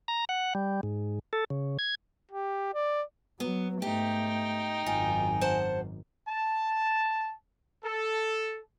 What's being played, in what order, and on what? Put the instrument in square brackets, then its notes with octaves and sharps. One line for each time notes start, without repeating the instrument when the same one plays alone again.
[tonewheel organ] A#5
F#5
G3
G#2
A4
C#3
G#6
[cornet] G4
D5
[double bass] F#3 [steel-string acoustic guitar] B3
[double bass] G#2 A3 [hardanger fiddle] D#4 G5 [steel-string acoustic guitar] G4
[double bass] G#1 F#2 [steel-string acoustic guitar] F4 [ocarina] G#5
[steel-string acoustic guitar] C5 F#5 A5
[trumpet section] A5
A4